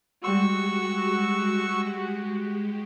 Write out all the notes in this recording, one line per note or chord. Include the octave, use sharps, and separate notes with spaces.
G3 G#3 F#4 G4 C6 C#6 E6